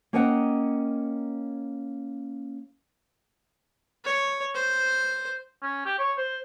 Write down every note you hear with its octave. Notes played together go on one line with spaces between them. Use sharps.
A#3 C#4 A#4 D#5 F#5 G5
C#5
C5
C#4
G4
C#5
C5